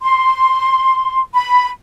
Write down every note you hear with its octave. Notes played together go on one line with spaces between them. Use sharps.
C6
B5